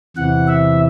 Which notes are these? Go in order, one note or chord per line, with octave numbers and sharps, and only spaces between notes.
E2 C3 E3 F#5
E5